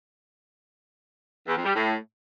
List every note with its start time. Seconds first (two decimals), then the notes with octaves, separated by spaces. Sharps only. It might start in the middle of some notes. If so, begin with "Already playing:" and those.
1.47 E2
1.56 F2
1.65 G3
1.74 A2